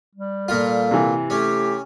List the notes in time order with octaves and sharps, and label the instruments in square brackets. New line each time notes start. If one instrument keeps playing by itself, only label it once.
[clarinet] G3
[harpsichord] A#2 F4 [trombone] A4
[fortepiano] C3 E3
[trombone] A3 [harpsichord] C#4 [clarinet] G4